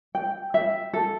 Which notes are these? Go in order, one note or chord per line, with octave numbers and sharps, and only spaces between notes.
G5
E5
A4